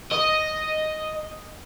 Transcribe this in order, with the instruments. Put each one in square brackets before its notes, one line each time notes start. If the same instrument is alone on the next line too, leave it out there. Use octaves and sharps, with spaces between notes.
[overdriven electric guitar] D#5